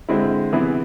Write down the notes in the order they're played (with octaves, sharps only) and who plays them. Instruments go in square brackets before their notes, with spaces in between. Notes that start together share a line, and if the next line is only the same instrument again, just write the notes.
[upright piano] D3 G#3 C4 E4
C3 E3 B3 E4 G#4